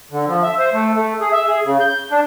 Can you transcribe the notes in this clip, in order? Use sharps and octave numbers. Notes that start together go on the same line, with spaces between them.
D3
F3
E5
C5
A3
A3
G#4
E5
G#4
C#3
G6
D4